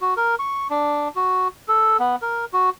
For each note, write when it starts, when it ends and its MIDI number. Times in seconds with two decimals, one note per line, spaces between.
0.01 0.14 66
0.17 0.35 70
0.39 0.67 85
0.70 1.08 62
1.16 1.48 66
1.68 1.97 69
2.00 2.16 59
2.22 2.45 70
2.53 2.70 66